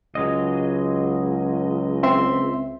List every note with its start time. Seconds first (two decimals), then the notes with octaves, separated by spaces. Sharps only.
0.15 C#2 F#3 G#3 D#5
2.03 C4 E5 C6